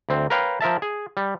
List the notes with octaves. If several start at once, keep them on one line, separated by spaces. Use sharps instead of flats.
D2 C4
A#4 B4 C#5 F5 G5
F3 A#4 E5 A5
G#4
G3